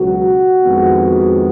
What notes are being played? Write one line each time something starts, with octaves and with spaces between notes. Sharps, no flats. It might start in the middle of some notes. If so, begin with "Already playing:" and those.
Already playing: C#2 B2 F#3 B3 F#4
F2 D#3 G#3 B3